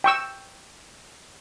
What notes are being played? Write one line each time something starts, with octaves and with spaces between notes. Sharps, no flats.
G5 C#6 E6